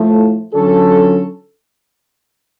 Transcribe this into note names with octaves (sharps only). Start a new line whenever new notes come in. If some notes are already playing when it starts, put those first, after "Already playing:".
Already playing: A2 F3 A3
D3 F#3 C#4 F4 A4